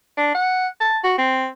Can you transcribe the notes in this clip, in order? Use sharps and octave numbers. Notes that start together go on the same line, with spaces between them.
D4
F#5
A5
F#4
C4